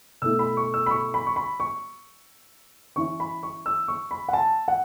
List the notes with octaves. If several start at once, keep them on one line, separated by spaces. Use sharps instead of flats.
B2 A3 E4 E6
B5
C#6
E6
B5
C#6
B5
C#6
B5
C#6
E3 C#4 E4 C#6
B5
C#6
E6
C#6
B5
F#5
A5
F#5